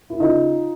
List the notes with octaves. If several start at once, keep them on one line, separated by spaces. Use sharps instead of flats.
E4
C#3 D#4 F4